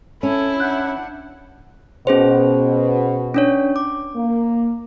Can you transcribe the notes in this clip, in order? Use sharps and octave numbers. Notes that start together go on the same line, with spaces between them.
C#4 E4 A4
D4 F#5 F#6 G6
B2 C#4 G#4 C5
C#4 D4 C#5
D6
A#3